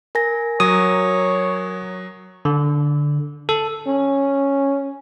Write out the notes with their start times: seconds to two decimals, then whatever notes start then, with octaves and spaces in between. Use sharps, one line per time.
0.15 A#4 G#5 A#6
0.60 F#3 C#5 D#6
2.45 D3
3.49 A4
3.87 C#4